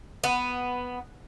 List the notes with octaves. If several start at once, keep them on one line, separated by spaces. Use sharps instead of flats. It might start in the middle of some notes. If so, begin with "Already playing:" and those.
B3